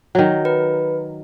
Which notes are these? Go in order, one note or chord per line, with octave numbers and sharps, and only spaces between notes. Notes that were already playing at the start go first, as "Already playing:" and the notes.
D#3 F#3
B4